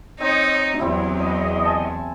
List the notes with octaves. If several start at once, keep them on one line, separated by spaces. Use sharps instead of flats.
C4 D#4 C#5 D#5
E2 F#3 G3 C4 E4
D#5
G#5 A5